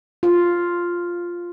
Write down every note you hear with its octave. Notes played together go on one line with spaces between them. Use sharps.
F4